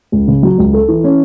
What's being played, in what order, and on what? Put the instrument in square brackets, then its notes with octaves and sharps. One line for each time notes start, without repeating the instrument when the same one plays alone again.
[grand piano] C#2
C#3
F#3
C#2
A4
E3
C#4